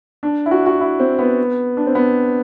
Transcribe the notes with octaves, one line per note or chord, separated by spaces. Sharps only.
D4
E4
F#4
F#4
E4
C4
B3
D4
C4
B3